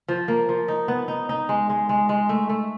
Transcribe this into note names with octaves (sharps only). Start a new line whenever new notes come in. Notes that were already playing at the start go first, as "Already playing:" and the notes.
F3
A#3
F3
D#4
B3
D#4
D#4
G#3
G#3
G#3
G#3
A3
A3